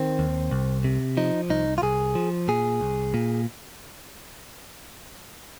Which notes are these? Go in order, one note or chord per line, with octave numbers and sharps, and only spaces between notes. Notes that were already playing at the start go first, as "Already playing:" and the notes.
Already playing: D#3 C4
D#2
C2
C3
F3 D#4
C2 D#4
F4
C2 G#4
F3
A#2 G#4
C2
A#2